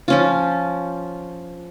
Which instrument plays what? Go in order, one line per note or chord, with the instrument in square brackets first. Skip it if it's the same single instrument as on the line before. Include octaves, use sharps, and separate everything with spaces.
[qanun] F3 C#4 F4